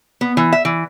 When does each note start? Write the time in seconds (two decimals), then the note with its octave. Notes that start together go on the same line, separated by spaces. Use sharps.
0.21 B3
0.37 E3
0.53 E5
0.65 E3